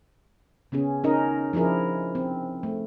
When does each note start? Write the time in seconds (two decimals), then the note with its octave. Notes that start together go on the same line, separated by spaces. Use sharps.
0.72 C#3 B3 C#4 G#4
1.04 C#4 D#4 A#4 D#5
1.53 F3 D4 E4 G#4 A#4
2.15 C4
2.63 A3